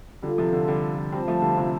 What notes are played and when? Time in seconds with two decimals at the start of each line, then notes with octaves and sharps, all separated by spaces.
0.22 D3 G3 F4 A4 F5
0.38 C3 F3
0.53 D3
0.68 D3 G3
1.12 G3 C4 F4 C5 F5 A5
1.28 F3 A3
1.42 D3 G3
1.57 C3 F3